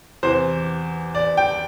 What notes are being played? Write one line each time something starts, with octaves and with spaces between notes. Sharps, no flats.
E2 C3 E3 C5
D5
G5